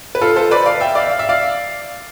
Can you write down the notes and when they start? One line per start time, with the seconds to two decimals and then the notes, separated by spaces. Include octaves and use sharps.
0.15 B4
0.21 F4 A4
0.36 A4 C5
0.51 B4 D5
0.66 D5 F5
0.81 E5 G5
0.95 D5 F5
1.11 F5
1.19 E5
1.29 D5 F5